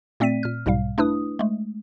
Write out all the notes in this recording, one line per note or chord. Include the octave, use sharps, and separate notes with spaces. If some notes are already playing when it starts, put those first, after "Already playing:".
A#2 A3 C4 D5 B6 D#7
A#2 F6
B1 G#2 B2 G3 F5
A3 D4 E4 B4 D#6
G#3 A3